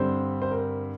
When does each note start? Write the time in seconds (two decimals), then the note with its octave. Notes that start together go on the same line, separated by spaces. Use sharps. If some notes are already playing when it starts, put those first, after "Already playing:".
Already playing: G2 D3 G3 C4 C5
0.42 C5
0.51 A#4